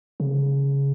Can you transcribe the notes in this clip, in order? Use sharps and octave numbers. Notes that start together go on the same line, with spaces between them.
C#3